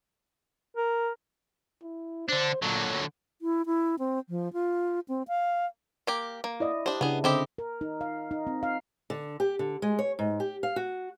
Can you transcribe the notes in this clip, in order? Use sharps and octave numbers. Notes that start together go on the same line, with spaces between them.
A#4
E4
D3 D4 C5
A#2 D3 F#3
E4
E4
C4
F3
F4
C4
F5
A#3 G4
A#3
E4 D5 D#5
D4 G4 C5
C#3 B3 D4 E4 G#4
D3 C4 E4 G4 C5 D#5
A#4
D#4
F5
D#4
C4
F5
D3
G4
D3
G#3
C#5
G#2
G4
F5
F#4